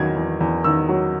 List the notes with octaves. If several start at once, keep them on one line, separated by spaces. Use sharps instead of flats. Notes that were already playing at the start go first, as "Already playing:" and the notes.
Already playing: E2 D#3 F#3 G#6
E2
E2
D#3 E6
F#3